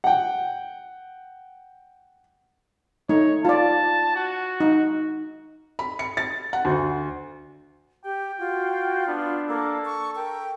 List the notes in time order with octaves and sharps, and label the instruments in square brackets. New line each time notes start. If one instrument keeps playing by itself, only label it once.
[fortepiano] F#5 G5
[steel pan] A3 D#4 [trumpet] C#5
[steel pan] F4 D5 [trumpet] A5
[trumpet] F#4
[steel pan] D#4
[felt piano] B5
C#7
A6
F#5
D2
[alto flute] G4 [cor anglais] G5
[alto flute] F4 [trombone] F#4
[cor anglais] B3 [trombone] D4
[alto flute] A#3 [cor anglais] A4
[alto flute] C#6
[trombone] A#4 [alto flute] G5